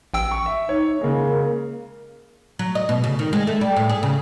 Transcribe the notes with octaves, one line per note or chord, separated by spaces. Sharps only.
A1 G5 E6
C#6
E5
D#4 C#5
C#3 G#3 A#3
F#3
D#5
B2
C#3
D#3
G#3
A3
G3
A2
G#4
C#3